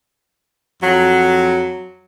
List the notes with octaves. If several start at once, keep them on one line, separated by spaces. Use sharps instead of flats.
F2 F#3